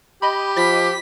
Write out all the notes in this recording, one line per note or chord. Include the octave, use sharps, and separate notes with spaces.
G4 D#5 B5
F3 B6